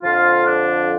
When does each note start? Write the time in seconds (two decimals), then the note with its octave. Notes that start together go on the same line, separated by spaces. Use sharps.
0.03 F2 D3 F3 F4
0.47 D4